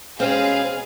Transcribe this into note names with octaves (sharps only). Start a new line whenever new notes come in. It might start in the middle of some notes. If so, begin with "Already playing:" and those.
B2 G3 G#3 C4 C#4 G#4 F5